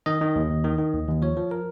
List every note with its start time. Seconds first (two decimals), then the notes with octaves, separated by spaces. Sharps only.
0.06 D#3 D#5
0.21 D#3
0.36 D#2
0.50 D#2
0.64 D#3
0.78 D#3
0.93 D#2
1.08 D#2
1.22 F3 C#5
1.37 F3
1.51 A#4